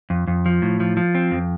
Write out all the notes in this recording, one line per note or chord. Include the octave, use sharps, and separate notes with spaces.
F2
F2
F3
A2
F3
F3
C4
F2